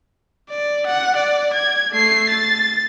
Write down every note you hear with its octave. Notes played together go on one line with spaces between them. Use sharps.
D5
F#5
D5
G#6
A3 C7
A6